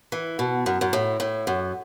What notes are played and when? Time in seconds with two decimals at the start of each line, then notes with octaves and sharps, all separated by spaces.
0.12 E3
0.39 B2
0.66 F#2
0.81 F#2
0.93 A2
1.20 A2
1.47 F#2